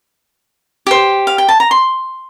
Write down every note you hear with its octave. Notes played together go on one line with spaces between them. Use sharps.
G4 C5
F5
G5
A5
A#5
C6